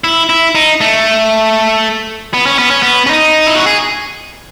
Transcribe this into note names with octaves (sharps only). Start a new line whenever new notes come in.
E4
E4
D#4
A3
B3
C#4
B3
C#4
B3
C#4
D#4
E4
F#4
G#4